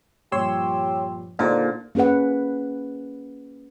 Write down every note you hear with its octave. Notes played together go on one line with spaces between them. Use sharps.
G2 A#2 F3 G4 C#5 C6 E6
A#2 D3 D4 D#4 G#4 A#4 C5
A#3 C#4 G#4 B4 F#5